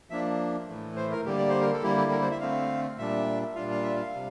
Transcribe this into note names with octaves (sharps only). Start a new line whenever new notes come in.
F3 A#3 D4 E5
A2 E3 A3
C5
A#4
D3 G3 A#3 G4
D5
C5
A#4
A4
D3 G3 A#3 E4 G4
G4
A#4
C5
E5
D3 A3 C4 F5
A#2 G3 D4 E5
A#2 G3 D4 F4 F5
F5
E5
F5
C3 G3